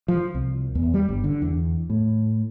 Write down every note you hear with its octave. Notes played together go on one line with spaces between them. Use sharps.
F3
C2
E2
G3
G1
D3
E2
A2